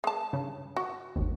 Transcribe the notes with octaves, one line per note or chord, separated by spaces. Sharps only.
G#3 A5
G2 C#3
F#4
G#1 D#2